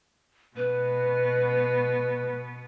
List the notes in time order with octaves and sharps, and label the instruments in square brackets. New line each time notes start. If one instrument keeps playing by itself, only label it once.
[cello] B2 B3 [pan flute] B4